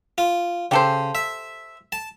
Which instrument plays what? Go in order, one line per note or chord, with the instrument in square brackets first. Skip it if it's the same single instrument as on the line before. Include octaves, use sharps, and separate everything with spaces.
[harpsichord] F4
[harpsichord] C#3 [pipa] G4 A4 C5
[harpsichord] E5
A5